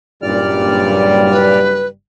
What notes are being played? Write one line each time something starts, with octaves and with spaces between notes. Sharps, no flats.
F#1 G2 A#2 G3 D5 F6
B4